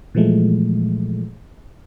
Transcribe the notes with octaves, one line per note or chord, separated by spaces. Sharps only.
A#2 E3 F3 G#3 A3